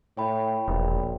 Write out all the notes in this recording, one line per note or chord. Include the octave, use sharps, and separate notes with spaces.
A2 C#5 G5 B5
E1 A#1